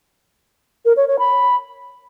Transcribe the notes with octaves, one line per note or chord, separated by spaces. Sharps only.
A#4
C#5
C#5
B5